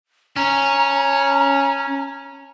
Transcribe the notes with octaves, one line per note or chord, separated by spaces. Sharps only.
C#4 A#5